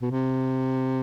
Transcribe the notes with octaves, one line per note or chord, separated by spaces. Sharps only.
B2
C3